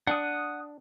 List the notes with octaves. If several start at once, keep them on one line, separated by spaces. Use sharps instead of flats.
D4 F#5 D#6